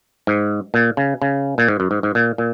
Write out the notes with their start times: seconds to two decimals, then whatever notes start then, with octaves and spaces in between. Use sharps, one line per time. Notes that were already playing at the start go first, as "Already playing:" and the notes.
0.27 G#2
0.74 A#2
0.97 C#3
1.22 C#3
1.58 A#2
1.68 G#2
1.80 F#2
1.91 G#2
2.03 G#2
2.15 A#2
2.38 A#2